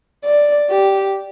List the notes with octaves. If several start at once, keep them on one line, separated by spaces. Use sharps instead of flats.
D5
G4